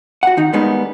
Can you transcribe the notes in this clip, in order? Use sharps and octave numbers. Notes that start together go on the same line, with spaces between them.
F#4 F#5
D#3 D#4
G3 G#3 A#3 B3 C#4 D#4